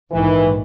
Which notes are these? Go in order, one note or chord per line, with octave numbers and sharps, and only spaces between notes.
A#1 G#2 D#3 E3